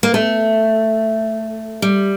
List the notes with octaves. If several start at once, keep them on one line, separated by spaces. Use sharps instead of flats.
A#3
A3
G3